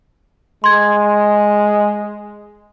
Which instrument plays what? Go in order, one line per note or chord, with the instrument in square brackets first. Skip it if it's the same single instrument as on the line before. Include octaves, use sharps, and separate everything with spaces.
[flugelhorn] G#3 [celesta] C6 G#6